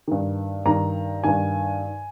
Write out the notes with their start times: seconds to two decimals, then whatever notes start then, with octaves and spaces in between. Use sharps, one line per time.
0.08 G2 D#3
0.65 G2 D#3 A#5
1.24 G2 D#3 G#5